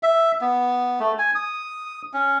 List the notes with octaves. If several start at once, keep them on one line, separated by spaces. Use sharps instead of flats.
E5
B3
A3
G#5
D#6
C#4